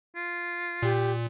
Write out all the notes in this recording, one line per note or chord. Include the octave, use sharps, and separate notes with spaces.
F4
A#2 G4